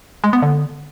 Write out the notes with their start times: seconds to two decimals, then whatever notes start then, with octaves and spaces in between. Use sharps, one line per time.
0.24 G#3
0.33 B3
0.42 D3